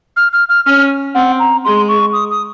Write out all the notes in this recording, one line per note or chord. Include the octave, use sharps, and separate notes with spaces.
F6
F6
F6
C#4 F6
C4 F#5
A#5
G#3 C6
C#6
D#6
D#6